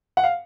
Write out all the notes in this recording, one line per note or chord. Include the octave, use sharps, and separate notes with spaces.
F#5
F5